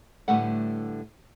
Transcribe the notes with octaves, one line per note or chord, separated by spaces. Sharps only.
A2 D3 G3 A3 B4 F#5